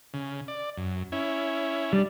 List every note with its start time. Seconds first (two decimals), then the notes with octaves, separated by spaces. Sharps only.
0.14 C#3
0.48 D5
0.77 F#2
1.12 C#4 E4
1.93 G3 D4